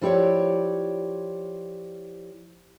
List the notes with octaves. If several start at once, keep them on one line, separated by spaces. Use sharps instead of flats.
F3 E4 G4 C#5 D5